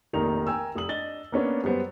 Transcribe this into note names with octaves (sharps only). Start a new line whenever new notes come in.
F1 A#1 D#3 D#4 A#4 F7
A#4 G5 G#5 E6
F1 D#6 F#7
D4 D#5 A6 G7
A#3 B3 C#4 D4
F#2 G3 B3 C5